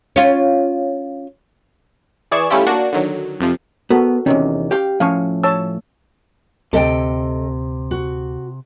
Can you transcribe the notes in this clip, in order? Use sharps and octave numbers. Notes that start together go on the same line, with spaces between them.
C#4 F4
E3 G#4 D5 C#6 G#6 E7
G3 A3 C#4 E4 F4 G4
A#3 D4 F#4
D3 D#3 F#3
F2 C3 F3
B3 F#4 A4 A#4
E2 C3 D#3 C#4
G4 F5 G5
A2 F3 C#4 F5 C#6
C#5 A5 E6
D2 C3 A4 D#5 G5
F#4